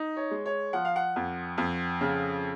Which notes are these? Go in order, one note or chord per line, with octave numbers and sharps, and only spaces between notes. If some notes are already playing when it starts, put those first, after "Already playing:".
Already playing: D#4
C#5
G#3
C#5
F3 F#5
F5
F#5
F2
F2
C#3